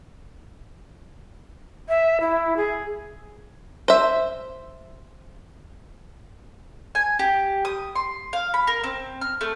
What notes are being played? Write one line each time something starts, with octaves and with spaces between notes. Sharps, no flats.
E5
E4
G#4
C5 E5
G#5
G4
D#6
C6
F5
B5
A#4
C4
F6
A3